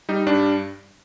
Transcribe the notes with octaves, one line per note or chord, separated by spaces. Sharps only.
G3 D#4
G2 D4